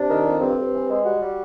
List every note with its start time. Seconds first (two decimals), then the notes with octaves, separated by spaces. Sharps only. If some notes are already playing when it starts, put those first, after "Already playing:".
Already playing: C3 D4
0.09 D#3
0.26 F2
0.41 G2 C4
0.58 G2
0.73 E3
0.90 G#3
1.05 G3 F#4
1.22 G3